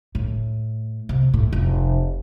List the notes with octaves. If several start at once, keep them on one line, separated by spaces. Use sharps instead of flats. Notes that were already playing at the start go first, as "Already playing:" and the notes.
A2
C3
A2
F1